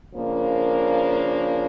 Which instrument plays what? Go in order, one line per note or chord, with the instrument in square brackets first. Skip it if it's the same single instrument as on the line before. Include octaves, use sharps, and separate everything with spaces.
[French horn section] C#3 F3 A#3 D4